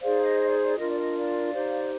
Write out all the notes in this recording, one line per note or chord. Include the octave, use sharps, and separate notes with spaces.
D#4 G#4 C5 D5 F5
D#5
D#5
D5
D5
D4 F4 A#4 D#5
D5
D#5
D5 F5
D#4 G4 C5